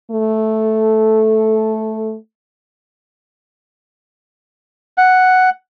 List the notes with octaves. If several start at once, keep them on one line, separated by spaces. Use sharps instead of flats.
A3 A4
F#5